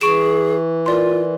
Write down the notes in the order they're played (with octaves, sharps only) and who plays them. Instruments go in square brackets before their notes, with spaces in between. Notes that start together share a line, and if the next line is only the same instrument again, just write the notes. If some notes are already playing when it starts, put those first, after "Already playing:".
[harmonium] E3 [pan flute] G#4 [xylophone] C#6 D7 E7
[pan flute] F4 [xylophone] A#4 D5 C6